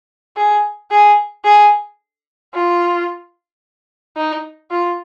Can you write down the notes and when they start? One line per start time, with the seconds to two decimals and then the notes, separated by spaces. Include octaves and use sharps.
0.36 G#4
0.91 G#4
1.45 G#4
2.54 F4
4.17 D#4
4.71 F4